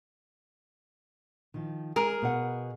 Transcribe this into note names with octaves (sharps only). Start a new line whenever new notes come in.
D#3 F3
G#3 G#4 A#4
B2 F5 F#5